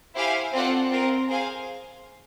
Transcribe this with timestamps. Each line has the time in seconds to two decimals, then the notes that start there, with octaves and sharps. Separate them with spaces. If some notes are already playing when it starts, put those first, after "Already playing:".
0.16 E4 G4 C5 F5 G#5
0.53 C4 F4 A4 D5 F#5
0.91 C4 F4 A#4
1.28 G#4 C5 F5 G#5